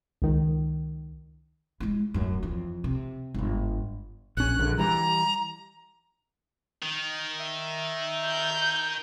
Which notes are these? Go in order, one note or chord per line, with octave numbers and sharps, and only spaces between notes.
C#2 D#3
G#3 E4
D1 F#2
F2 E3
C3
G1 G#2
A#1 C#4 F#6
A#1 D3
E3 G3 A#5
D#3
E5
G6